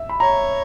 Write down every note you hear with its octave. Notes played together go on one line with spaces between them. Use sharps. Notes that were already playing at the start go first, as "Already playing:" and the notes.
Already playing: E5
B5
C#5 A#5